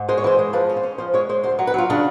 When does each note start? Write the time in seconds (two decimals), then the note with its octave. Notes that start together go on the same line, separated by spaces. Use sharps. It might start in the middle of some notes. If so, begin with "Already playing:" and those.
Already playing: G#2
0.09 G#3 C5
0.18 C#5
0.24 E3 C5
0.39 G#3
0.53 F3 B4
0.69 C#4
0.77 C5
0.83 C#4
0.98 F3 C5
1.14 G#3 C#5
1.29 G#3 C5
1.44 D2 C5
1.59 F#3
1.67 B4
1.74 F#3 F4
1.90 C#3 D4